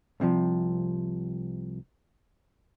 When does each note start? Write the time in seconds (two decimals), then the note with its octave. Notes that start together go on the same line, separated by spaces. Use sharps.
0.20 C2 C3 E3 F3